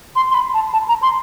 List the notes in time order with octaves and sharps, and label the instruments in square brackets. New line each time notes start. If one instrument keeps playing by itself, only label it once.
[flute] C6
C6
B5
A5
A5
A#5
C6